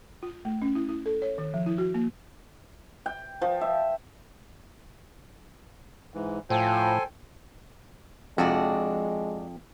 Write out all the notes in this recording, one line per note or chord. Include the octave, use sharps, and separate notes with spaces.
F4
A3
C#4
E4
E4
A4
C#5
D#3
F3
E4
F#4
A#3
G5
F3
E5
G#2 E3
A2 F3 A4 C5 G5 G#5
F2 C3 G#3 D4 F#4